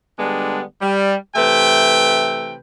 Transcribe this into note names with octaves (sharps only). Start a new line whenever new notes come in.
D3 G3 G#3 B3 D4
G3
C3 E3 A3 B4 G5